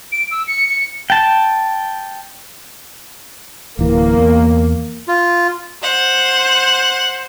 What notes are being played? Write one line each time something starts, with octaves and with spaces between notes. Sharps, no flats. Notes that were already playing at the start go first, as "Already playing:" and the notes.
D7
E6
C#7
C#7
G5 A5
D1 E3 A#3
E2
F4
C5 F#5